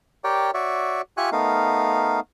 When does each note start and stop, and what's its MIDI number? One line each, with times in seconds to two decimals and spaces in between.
0.24 0.51 67
0.24 0.51 70
0.24 0.51 73
0.24 0.51 74
0.24 0.51 79
0.54 1.01 66
0.54 1.01 73
0.54 1.01 74
0.54 1.01 76
1.17 1.30 65
1.17 1.30 67
1.17 1.30 76
1.17 1.30 80
1.17 1.30 85
1.17 1.30 90
1.32 2.20 57
1.32 2.20 59
1.32 2.20 63
1.32 2.20 70
1.32 2.20 77